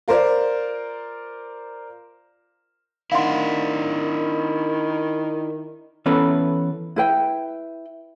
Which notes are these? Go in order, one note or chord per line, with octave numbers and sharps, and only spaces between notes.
F4 A#4 C5 D5
D#3 D4 E4 F5 F#5 C6
E3 B3 C#4 A4 B4
E4 B4 G5